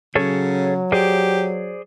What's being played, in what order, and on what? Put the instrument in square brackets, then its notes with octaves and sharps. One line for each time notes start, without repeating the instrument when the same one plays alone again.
[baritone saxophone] C#3 [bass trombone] F#3 [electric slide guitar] G#4 A4 C#5
[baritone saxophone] G4 [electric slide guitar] G#4 C5 D5